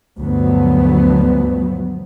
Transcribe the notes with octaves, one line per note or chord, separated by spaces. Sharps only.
D2 G2 F3 F#3 B3